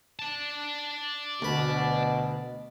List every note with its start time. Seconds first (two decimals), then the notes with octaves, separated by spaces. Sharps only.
0.19 D5 A5
1.42 D2 B2 B5